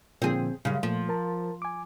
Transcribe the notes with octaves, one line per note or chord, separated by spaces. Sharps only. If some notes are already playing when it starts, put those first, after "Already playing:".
A#2 D3 F3 C4 G#4
F#2 C#3 G3
A#2 F3 A3
A#4 A5
G#5 D6